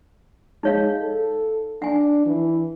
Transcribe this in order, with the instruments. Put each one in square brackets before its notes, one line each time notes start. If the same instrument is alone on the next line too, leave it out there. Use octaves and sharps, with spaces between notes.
[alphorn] G#3 [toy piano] D#4 C#5 F5
[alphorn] A4
[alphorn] D4 [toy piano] F#5 G#5
[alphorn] E3